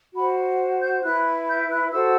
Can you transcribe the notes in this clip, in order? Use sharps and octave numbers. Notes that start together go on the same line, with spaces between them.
F#4 C5 B5
G6
E4 B4 F#6
G6
F#6
F#4 A4 C5 E6